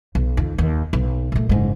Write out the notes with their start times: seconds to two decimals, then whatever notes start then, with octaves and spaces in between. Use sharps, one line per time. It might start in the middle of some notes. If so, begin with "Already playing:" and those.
0.15 B1
0.37 F2 D#3
0.58 D#2
0.93 B1
1.32 A#2 A3
1.49 F#1 G#2